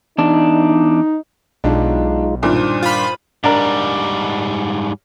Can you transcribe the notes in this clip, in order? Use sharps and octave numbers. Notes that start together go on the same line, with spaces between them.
E2 D4 D#4
B1 G#3 D4 D#4 F4
G2 A#2 D#3 C4 E4
C5 D#6
F4 B5
G#2 G3 D4 A#4